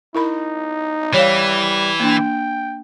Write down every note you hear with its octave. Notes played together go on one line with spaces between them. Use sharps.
D#4 E4 A#4 B5
E3 G3 C#5 F5
A#3 D4 G5